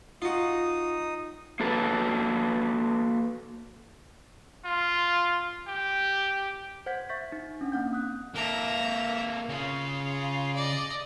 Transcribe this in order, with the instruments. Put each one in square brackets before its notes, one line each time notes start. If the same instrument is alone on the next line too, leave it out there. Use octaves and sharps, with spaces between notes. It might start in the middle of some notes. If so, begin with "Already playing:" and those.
[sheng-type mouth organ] D#4 D#6 [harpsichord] F4 F#4
[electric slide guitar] A#3 F#4 A4 B4
[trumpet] F4
G4
[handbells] C5 F#5 G6 G#6 B6
E5 C#6 G6 A6 B6
D#4
C#4 D4 F#5
A#3 C4 F#5 G6
D#6 F#6
[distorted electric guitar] A#3 A4 [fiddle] E5 A#5
[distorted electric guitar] C#3 [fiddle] F4
[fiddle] D5 D#5